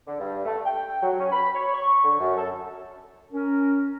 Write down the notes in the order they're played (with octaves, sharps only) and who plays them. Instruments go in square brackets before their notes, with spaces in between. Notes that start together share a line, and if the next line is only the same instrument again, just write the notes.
[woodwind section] D3
G2
A3
G5
F#3
C#4
B5
C#5
C#6
D3
F#2
A4
C#4 A#4